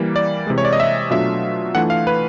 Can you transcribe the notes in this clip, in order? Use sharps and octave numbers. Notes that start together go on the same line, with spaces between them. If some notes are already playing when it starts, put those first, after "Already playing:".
Already playing: E3 G3 A#3
D5
C3 E3 G#3
C#5
D5
D#5
E5
B2 F#3 A3 D4 F4 E5
E3 A3 D4 F4 F#5
F5
B4